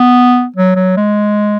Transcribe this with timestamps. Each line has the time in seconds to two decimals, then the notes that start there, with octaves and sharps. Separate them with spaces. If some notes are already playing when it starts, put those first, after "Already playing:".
Already playing: B3
0.56 F#3
0.76 F#3
0.97 G#3